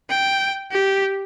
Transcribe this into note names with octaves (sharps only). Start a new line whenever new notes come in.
G5
G4